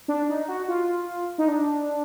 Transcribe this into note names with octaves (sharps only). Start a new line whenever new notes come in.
D4
D#4
F#4
F4
D#4
D4